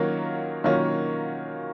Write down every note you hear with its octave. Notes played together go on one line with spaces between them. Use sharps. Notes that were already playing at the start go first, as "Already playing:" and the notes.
Already playing: D#3 F#3 A#3 C#4 F4
D#3 F#3 A#3 C#4 F4